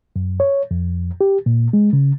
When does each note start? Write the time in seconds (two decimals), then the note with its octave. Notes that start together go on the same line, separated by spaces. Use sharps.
0.16 F#2
0.40 C#5
0.71 F2
1.21 G4
1.46 A#2
1.73 G#3
1.93 C#3